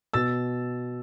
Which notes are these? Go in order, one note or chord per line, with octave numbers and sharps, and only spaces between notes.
B2 E6 A6